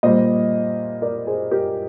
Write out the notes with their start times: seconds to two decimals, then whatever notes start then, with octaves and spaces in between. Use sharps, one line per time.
0.03 A#2 G3 C5 D#5
1.02 A#4 D5
1.27 G#4 C5
1.51 G4 A#4